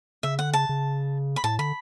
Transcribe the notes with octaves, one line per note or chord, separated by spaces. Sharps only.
C#3 E5
D3 F#5
C#3 A5
C#3
B5
A2 A5
D3 B5